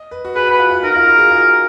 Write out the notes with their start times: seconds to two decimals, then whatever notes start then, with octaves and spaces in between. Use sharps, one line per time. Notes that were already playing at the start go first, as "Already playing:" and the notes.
Already playing: D#5
0.11 B4
0.25 F#4
0.36 G#4 B4
0.47 F#4 B4
0.59 F4
0.71 F4
0.83 D#4 A#4
0.96 F4
1.08 F#4
1.19 G#4
1.31 F4